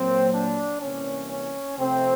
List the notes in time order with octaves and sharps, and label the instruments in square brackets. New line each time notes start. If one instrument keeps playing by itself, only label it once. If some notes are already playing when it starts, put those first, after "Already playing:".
Already playing: [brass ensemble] A#2 F#3 A#3 C4
D4
C3 E3 G3 A#3 C#4
C#4
C3 F3 A3 C4